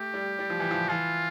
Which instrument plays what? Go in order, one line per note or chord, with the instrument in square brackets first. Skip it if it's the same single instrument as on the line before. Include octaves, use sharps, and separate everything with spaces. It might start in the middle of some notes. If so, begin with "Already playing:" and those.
Already playing: [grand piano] A3 [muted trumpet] G4
[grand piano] G3
G3
F3
E3
F3
[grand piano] E3 [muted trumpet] F4